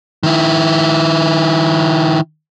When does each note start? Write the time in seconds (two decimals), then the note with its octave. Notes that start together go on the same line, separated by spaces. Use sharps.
0.23 D#3 E4